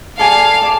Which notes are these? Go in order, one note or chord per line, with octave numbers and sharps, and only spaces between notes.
A4 D5 F5 G#5
D5 A5 D6